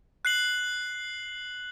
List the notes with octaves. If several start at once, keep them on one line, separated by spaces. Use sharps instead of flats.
F#6 C7 F#7